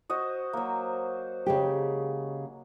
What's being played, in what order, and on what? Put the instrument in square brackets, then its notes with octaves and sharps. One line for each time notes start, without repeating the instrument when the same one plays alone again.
[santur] F#4 D#5 [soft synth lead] C5
[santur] F#3 A#3
[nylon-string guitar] C#3 G#3 G4